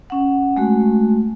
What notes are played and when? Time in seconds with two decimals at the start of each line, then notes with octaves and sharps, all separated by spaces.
0.10 C#4 F#5
0.57 G#3 A3 F#4